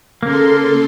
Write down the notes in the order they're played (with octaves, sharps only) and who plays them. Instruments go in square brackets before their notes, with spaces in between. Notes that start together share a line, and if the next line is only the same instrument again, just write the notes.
[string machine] C#3 A4 C6 [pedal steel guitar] A#3 A#4